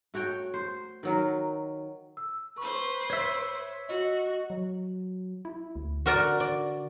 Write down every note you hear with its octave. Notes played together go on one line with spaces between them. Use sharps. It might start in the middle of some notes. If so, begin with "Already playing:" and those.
A3 F#4 C#5 G5
C5
D#3 F#3 A#4
E6
B4 C5 C#6
C#5 E5
F#4 D#5
F#3
E4
D2
D3 F#4 A#4 D5
D5